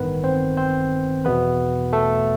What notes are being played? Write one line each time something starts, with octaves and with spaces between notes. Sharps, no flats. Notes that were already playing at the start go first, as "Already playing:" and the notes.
Already playing: A1 G2 D#3 B3 B4
C4 C5
C4 C5
E2 B2 B3 B4
A3 A4